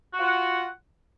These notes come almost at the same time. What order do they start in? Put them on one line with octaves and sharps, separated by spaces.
F#4 F4 F#5